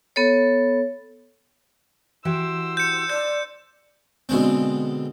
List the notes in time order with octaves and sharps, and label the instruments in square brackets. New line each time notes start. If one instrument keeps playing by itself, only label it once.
[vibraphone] B3 A4 C#5
[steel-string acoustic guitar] E3 F#4 G4 [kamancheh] C5 E6
[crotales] G6 C#7
[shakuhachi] D5 [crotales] G6
[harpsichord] B2 D3 G#3 C4